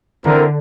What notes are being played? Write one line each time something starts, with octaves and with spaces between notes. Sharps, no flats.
D3 C4 E4 A#4